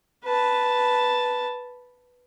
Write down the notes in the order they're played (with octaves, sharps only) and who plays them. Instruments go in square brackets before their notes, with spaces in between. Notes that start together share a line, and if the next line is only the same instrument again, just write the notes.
[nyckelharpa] B4 A5